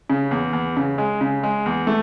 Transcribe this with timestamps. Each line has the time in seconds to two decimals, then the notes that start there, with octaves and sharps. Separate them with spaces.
0.10 C#3
0.31 E2
0.53 E2
0.77 C#3
0.98 G#3
1.21 C#3
1.43 G#3
1.66 E2
1.87 A3